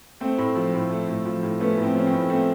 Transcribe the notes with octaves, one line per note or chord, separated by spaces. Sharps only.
A3 C4
A2
F3
A2
A3
A2
F3
A2
A3 B3 C#4
A2
C4
F3 C#4
C4
A2
A3 C4